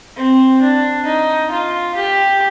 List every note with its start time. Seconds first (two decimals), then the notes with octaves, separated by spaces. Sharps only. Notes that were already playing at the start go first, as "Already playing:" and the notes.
0.16 C4
0.61 D4
1.05 D#4
1.51 F4
1.95 G4